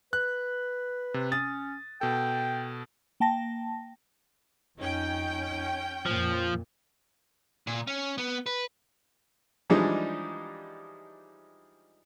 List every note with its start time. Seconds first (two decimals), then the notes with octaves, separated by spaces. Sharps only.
0.13 B4 F#6
1.14 C3
1.32 C#4 D#6 A6
2.01 B2 A4 G5
3.20 A#3 G5 A5 A#6
4.79 F2 C#4 D#4 G5
6.06 F2 A#2 F3
7.67 A#2
7.87 C#4
8.18 B3
8.46 B4
9.70 E3 F3 G3 G#3 D4 D#4